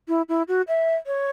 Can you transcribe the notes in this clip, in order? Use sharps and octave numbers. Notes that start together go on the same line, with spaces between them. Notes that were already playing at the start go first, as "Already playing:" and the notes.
E4
E4
F#4
E5
C#5